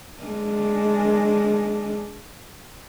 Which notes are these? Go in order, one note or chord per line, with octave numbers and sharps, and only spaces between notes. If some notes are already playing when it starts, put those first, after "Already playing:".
G#3 D4